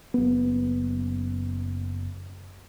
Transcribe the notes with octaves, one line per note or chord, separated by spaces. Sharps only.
F#1 B3